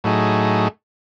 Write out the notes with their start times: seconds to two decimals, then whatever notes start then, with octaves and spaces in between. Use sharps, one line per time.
0.04 A2 F#3 A3 D#4 G#4